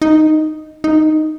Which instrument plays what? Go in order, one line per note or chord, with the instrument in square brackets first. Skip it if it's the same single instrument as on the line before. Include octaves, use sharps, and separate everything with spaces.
[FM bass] D#4
D#4